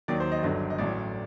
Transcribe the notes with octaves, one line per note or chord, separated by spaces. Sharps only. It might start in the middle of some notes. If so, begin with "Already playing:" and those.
D#2 D#3 F#3 D5
C5
D#5
G1 G2 D3 F#3 D#5
D#5
A1 A2 F#3 D5